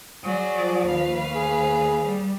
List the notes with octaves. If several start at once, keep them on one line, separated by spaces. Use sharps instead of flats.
F#3 G#4 D5
F3
D#2 B4 F5
G#4
G3